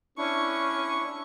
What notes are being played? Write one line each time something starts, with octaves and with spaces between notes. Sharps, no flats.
C#4 D4 E4 C#6